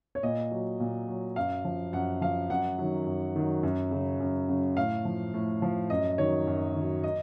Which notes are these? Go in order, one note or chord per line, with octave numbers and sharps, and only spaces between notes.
C#5
A#2 D#5
F#3
A#2
F#3
F#2 F5
F3
F#2 F#5
F3 F5
F#2 F#5
D#3 F#3
F#2
D#3 F#3
F#2
C#3 F#3
F#2
C#3 F#3
A2 F5
F3
A2
F3
F#2 D#5
D#3 F#3 C#5
F#2
D#3 F#3
D#5